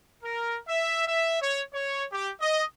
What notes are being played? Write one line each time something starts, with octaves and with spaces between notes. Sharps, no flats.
A#4
E5
E5
C#5
C#5
G4
D#5